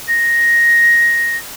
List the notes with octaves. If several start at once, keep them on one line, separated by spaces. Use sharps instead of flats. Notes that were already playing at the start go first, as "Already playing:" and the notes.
A#6